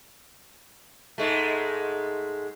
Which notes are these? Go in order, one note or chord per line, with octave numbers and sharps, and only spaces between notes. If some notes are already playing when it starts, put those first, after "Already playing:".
G#2 G#3 A3